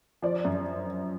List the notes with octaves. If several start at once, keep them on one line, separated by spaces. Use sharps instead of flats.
F3 D5
F#2